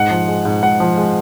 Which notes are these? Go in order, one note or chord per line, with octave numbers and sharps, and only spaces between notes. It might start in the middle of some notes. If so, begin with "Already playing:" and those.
Already playing: G#2 F#5
F3
G#3
G#2
G#2 F#5
F3
G#3